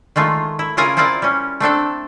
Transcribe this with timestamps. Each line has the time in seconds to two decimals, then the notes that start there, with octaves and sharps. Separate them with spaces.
0.16 D#3 G#3 A3 F4
0.59 E4
0.77 C#3 E4 F4 A#4 G#5 A#5
0.97 C4 E4 F4 A#4 D5
1.22 G3 C#4
1.60 A3 C4 D4 A4